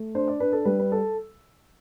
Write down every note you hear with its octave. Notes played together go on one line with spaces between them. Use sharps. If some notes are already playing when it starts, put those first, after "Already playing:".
Already playing: A3
D4 C5
D5
D4 B4
A4
G3 B4
B4
A4